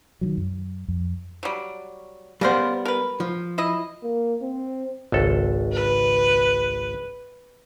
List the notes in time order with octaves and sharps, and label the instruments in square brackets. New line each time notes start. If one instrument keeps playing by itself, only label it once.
[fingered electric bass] D#3 F3 F#3
F#2
F2
[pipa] F#3 G3
[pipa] C#3 A#4 C5 [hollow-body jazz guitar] G3 B3
[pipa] A#4 B4
[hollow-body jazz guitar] F3
[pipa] E4 D#5
[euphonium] A#3
C4
[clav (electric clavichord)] G#1 C#2 A4
[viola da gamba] B4